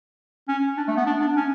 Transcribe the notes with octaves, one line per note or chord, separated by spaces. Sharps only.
C#4
D4
A3
B3
D4
D4
C#4